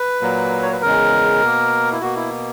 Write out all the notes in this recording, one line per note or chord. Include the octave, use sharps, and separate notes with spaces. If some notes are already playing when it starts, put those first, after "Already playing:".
Already playing: B4
A#2 F#3 A#3
C#5
B4
E2 C#3 G#3 A#4
B2 A#3
E4
B2 A#3 F#4
E4